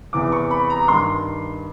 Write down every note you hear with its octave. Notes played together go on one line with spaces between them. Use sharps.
E2 C3 E3 D6
C#6
B5
A#5
G2 D#3 C6